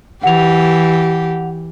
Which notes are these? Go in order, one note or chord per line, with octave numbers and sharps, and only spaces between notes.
E3 G4 F#5 F7